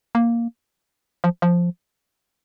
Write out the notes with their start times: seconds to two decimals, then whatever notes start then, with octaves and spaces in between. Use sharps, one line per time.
0.15 A#3
1.24 F3
1.42 F3